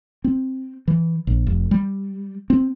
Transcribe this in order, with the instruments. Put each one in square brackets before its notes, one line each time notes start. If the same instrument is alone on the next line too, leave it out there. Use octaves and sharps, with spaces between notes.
[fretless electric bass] C4
E3
A#1
F1
G3
C4